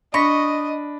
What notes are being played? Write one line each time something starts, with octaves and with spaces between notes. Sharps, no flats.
D4 D#5 B5 C#6 A#6 B6